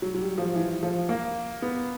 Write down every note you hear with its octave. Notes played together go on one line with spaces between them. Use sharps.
F#3
F#3
G3
F3
E3
F3
A#3
B3